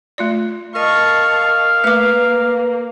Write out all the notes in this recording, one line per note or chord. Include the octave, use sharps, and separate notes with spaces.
A3 F4 D5
A#4 D#5 F5 A5 C#6 D#6
A3 A#3 B4 D6